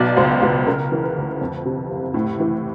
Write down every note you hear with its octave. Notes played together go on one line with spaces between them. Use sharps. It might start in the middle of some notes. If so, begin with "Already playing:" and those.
Already playing: B1 B2 D5
C#2 C5
C#2 B4
C#3 A#4
E3
B4
D2
F2
C3
F#1
A2
E3